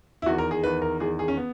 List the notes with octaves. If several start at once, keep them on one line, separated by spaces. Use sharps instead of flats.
E4
E2 D#3 F#4
A#4
G#4
E2 D#3 B4
A#4
E2 D#3 G#4
G#4
C#4
B3